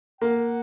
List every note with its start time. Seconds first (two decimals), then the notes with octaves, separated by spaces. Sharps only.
0.21 A#3 F#5